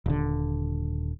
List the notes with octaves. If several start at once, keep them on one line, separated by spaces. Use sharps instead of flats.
D#1 D3